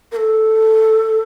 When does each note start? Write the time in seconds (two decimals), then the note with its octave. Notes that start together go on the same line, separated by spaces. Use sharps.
0.12 A#4
0.16 A4